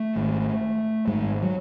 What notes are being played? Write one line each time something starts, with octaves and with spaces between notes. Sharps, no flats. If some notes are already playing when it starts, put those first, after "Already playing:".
Already playing: A3
G#1 G#2
G#1 G#2 G#3
F#3